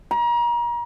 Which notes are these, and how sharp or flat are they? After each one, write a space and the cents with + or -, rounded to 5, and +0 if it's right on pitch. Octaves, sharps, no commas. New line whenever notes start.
A#5 +35